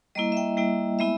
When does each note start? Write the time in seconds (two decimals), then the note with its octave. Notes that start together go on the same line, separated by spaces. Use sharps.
0.15 G3 A#3 E4 D#5
0.32 E5
0.37 G5
0.57 G3 A#3 E4 G5
0.99 G#3 B3 E4 E5